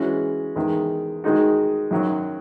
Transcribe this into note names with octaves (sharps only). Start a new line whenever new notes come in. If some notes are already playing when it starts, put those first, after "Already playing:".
Already playing: E3 G#3 C#4 F#4
E2 D#3 G#3
D#3 G#3 D#4 F#4
F#2 D#3 F#3